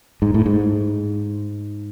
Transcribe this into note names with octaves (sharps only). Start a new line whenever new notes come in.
G#2
A2
G#2